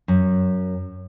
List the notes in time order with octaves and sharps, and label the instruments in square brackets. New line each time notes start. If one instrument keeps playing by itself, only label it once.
[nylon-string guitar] F#2